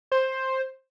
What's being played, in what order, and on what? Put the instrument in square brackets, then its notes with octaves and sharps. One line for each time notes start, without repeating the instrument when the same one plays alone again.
[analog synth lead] C5